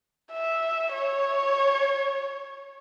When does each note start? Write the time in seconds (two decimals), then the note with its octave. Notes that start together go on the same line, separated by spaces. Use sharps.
0.32 E5
0.94 C#5